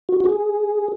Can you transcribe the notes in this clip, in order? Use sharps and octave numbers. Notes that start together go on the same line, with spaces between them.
F#4
F#4
G#4